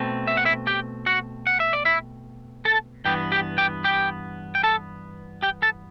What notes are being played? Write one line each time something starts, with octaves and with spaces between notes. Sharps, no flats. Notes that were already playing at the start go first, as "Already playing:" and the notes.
Already playing: B2 A3 C4
E5
F#5
E4 E5
G4 G5
F#4 F#5
F#5
E5
D5
E4 E5
A4 A5
G2 E3 B3 G4 G5
G4 G5
G4 G5
G4 G5
G5
A4 A5
G4 G5
A4 A5